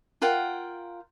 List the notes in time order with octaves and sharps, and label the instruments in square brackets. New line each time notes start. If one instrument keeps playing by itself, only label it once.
[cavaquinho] F4 A#4 F#5 G5